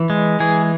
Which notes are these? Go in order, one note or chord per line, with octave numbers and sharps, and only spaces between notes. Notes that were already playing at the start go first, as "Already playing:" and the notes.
Already playing: E3
G#3
E3 G#4